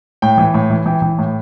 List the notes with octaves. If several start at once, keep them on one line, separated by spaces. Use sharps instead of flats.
A2 G5
E3
A2
E3
E3 G5
E3
A2